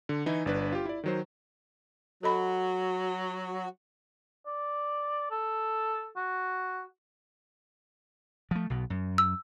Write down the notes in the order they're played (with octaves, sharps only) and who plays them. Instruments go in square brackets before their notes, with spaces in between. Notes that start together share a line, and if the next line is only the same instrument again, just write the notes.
[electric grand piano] D3
E3 D#4 E4
G1 D4 B4
F4 G4
E4 D5
D#3 F#3 C5
[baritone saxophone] F#3 [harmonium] F#4 [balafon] A4 D#5 B5
[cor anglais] D5
A4
F#4
[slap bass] F3 A3
B1 B2
F#2
[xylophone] E6